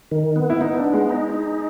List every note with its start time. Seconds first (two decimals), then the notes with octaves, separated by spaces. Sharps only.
0.11 D#3
0.36 B3
0.50 E4
0.61 B3 D#4
0.77 D4
0.84 B3
0.93 G#3
1.09 D#4
1.34 D#4